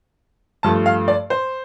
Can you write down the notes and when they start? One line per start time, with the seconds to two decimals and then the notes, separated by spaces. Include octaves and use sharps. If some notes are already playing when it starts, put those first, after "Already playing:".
0.63 G2 F3 A3 A5
0.86 F5
1.08 D5
1.30 C5